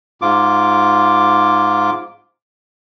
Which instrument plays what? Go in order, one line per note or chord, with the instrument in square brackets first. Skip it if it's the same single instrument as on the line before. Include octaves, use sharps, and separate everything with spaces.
[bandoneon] G#2 F4 D6